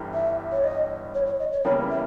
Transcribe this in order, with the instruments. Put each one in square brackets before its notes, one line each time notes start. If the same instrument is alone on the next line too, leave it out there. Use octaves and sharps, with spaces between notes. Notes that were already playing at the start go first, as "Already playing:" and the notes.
Already playing: [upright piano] G1 G2 E3 G3
[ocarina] E5
C#5
D#5
C#5
C#5
D#5
C#5
[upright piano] E2 C#3 E3 G3 A#3 [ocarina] C#5
[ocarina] E5